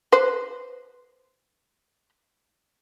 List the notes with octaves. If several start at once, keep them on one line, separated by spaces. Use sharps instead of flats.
B4 C5